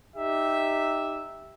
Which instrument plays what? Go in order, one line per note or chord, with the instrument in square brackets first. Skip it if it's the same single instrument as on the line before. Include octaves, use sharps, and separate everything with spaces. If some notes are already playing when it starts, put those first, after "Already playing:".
[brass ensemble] D#4 G4 E5